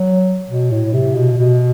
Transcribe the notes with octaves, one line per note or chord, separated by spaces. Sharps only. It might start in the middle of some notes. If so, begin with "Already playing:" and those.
Already playing: F#3
B2
A2
C3
B2
B2